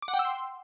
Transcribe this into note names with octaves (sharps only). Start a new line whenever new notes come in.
D6
F#5
G5
E6
C6